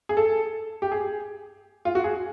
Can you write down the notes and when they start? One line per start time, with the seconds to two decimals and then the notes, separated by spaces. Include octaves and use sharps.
0.09 G#4
0.17 A4
0.82 G4
0.92 G#4
1.85 F4
1.95 F#4
2.04 G#4